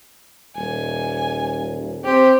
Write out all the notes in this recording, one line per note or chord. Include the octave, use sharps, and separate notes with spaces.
D#1 G#5
C4 G4